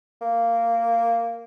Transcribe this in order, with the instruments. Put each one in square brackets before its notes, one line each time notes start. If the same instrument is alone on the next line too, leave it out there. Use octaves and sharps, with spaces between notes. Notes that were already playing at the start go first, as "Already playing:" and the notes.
[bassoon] A#3